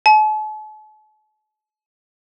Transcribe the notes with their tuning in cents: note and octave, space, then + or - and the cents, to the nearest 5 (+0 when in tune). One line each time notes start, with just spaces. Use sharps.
A5 -45